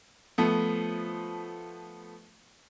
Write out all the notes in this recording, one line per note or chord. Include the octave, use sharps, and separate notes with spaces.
F3 A3 B3